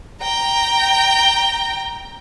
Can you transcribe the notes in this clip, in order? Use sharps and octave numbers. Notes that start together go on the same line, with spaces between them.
G5 A#5